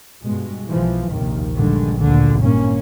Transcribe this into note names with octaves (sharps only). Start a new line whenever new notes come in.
G2 B2 G#3
B1 E3 F3
A#1 D#2 C3 D#3
A#1 G2 D3 D#3 G#3
D2 A#2 D3
G#1 G2 A#2 A#3 C#4